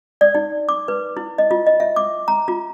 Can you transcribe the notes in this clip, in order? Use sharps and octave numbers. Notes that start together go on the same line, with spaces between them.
D5
D#4
D6
B4
E4
D#5
F4
D#5
E5
D6
A#5
F4